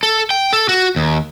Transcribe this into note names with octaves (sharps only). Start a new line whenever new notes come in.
A4
G5
A4
F#4
D#2